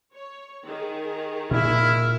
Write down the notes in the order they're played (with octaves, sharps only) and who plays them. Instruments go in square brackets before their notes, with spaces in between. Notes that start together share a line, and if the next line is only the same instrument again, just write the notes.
[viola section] C#5
D#3 G#4
[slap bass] A#2 [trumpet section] E4 [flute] F6